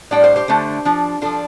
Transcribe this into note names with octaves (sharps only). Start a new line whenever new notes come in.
A2 G3 D4 D5 G5
C5 F5
G4 C5
D3 A3 D4
F3 D4
F3 D4 F4 A4